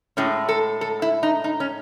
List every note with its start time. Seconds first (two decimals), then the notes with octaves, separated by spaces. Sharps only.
0.17 A2 G#3 C#4
0.49 A4
0.81 A4
1.02 E4
1.23 D#4
1.44 D#4
1.60 C#4